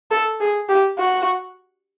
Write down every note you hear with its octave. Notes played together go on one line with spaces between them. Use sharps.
A4
G#4
G4
F#4